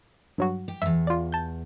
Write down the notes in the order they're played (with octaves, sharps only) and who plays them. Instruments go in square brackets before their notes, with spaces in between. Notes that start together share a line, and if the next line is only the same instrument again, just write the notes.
[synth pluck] G2 F#3 F#4
[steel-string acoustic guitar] G4
[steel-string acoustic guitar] E2 G2 [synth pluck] E5
[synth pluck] F4 D5
A5 G6